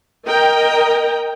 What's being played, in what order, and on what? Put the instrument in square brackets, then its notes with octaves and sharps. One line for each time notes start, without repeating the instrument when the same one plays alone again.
[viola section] A#4 D#5 G5 A#5